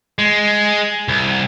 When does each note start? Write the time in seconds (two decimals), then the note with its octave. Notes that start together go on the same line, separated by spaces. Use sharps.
0.19 G#3
1.08 C2